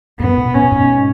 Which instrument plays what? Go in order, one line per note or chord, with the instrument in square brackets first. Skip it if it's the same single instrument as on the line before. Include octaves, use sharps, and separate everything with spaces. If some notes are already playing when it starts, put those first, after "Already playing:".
[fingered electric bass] F#2 A2 [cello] B3
[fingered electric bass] G#2 B2
[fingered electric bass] G#2 B2 [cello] C#4
[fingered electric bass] G#2 B2